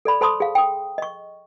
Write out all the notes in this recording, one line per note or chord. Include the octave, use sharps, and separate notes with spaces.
A4 D5 B5
A4 C5 A5 B5 C6 D#6
G#4 F5
G5 D#6
D#5 C#6